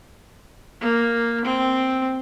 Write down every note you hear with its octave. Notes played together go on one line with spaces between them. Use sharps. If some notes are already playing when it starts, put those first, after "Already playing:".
A#3
C4